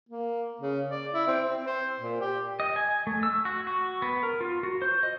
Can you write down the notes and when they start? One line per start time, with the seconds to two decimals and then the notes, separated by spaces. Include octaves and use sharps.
0.09 A#3
0.61 C#3
0.90 D5
1.14 E4
1.27 C4
1.47 C4
1.67 C5
1.99 A#2
2.21 G4
2.60 D#5
2.76 G#5
3.07 A3
3.23 E6
3.45 F#4
3.67 F#4
4.02 B3
4.23 A#4
4.41 F4
4.63 F#4
4.82 C5
5.03 D#5